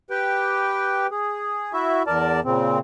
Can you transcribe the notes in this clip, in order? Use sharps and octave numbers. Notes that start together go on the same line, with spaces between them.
G4 B4 G5
G#4
E4 F#4 E5
E2 A#4 D5 A5
A#2 C#3 C4